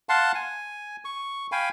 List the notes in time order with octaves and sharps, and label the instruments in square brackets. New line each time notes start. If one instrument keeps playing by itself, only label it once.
[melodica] F5 F#5 A5 C6
G#5
C#6
F5 G5 G#5 B5